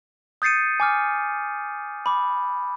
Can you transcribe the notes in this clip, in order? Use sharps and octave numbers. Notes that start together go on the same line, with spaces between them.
D#6 G6 A6 C7 C#7 D#7
G#5 D6 F6
B5 D6